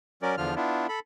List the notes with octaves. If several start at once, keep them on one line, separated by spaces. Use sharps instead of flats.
F#3 C#4 A#4 D5
E2 D3 F3 F4 F6
B3 D4 E4 F4
A4 B5